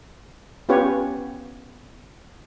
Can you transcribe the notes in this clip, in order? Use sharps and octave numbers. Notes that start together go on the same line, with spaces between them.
B3 C#4 F4 G4 B4 C#5